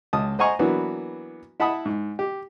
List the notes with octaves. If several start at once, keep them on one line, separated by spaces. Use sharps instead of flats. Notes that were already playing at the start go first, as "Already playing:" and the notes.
C#2 A5 D#6
C5 D#5 F#5 G#5 A#5 C#6
E3 F#3 A#3 B3 D4 F#4
E4 E5 F#5 A5 B5 D#6
G#2
G4